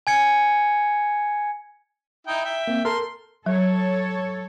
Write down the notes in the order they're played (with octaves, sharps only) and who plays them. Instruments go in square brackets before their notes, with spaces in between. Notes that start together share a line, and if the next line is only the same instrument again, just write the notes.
[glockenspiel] G#5 G#6 C#7
[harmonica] D#4 E4 G5
E5 G5
[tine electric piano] A#3 C4
[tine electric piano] A4 A#4 A5 [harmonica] C6
[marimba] F#3 [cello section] A4 C#5